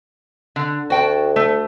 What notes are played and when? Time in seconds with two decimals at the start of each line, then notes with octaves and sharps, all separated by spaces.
0.56 D3
0.90 D2 F#4 G5 A5
1.36 A3